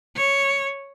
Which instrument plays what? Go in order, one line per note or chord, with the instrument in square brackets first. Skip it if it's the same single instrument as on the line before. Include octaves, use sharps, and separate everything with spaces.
[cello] C#5